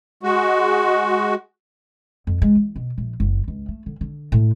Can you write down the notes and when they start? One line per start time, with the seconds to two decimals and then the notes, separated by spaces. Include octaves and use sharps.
0.23 G#3 F#4
2.27 F2
2.42 G#3
2.56 E2
2.76 B2
2.98 A#1
3.20 F#1
3.48 C#2
3.68 A3
3.86 D3
4.01 D3
4.32 A2